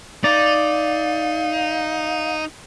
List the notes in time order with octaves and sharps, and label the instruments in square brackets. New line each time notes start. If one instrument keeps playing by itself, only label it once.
[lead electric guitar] D#4 [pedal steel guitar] D5 [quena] F5